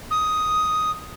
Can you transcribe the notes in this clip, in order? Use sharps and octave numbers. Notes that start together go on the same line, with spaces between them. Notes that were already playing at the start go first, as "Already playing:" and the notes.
D#6